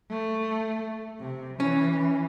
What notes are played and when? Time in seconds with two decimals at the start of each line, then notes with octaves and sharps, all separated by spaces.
0.10 A3
1.20 C3
1.60 E3 C#4